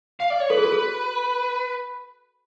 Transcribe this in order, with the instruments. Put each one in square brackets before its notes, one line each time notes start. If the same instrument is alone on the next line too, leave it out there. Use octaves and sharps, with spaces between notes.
[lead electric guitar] F5
D5
C#5
[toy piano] A4 [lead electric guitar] B4
[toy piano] G#4
F#4
G#4